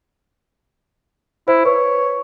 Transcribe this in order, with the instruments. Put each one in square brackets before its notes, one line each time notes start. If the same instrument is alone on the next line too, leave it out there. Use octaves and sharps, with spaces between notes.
[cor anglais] E4 [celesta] C5
[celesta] B4 [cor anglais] C#5